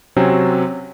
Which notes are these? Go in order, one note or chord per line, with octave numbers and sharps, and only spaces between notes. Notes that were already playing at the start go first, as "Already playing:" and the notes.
C3 F#3 C4 C#4